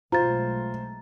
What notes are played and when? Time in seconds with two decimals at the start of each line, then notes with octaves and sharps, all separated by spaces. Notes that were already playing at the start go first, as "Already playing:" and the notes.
0.12 B1 G#3 A3 F4 C5 A#5 A6